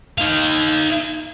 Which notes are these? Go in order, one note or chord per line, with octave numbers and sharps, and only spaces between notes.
D#4 F5